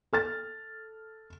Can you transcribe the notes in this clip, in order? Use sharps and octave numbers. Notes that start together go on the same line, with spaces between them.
A4 F6 A6